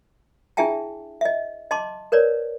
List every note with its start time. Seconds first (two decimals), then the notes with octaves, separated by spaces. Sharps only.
0.57 D4 E4 G#4 E5 G5 A5
1.21 D#5 E5
1.71 D#5 A5 C6 D6
2.12 A#4 B4 C#5 D5